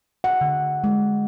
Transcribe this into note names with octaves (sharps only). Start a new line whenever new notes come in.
F#5
D3
G#3